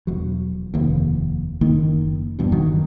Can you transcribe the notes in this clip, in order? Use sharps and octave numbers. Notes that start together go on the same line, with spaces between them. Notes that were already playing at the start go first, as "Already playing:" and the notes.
E1 F#3
F1 D#2
F#1 D#3 A#3
E2 G2 B2
F#1 D#3 F#3